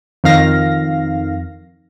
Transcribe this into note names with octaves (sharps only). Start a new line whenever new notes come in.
F2 D#3 F5 A#6